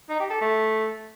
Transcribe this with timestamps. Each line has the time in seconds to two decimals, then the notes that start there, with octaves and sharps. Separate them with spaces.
0.09 D#4
0.20 G4
0.30 A4
0.41 A3